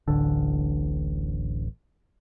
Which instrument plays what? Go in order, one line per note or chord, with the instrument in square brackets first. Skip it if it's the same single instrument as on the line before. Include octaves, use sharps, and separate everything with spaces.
[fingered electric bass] D1 A1 [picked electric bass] D3